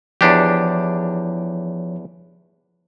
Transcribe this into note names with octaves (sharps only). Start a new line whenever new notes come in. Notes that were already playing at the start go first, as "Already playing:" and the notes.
E2 F3 D4 G4 C#5